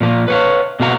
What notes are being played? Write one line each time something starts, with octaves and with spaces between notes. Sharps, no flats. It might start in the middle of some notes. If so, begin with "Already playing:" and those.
A#2 F3 A#3
B4 C#5 F5
B2 A#3 F#4 F5 A#5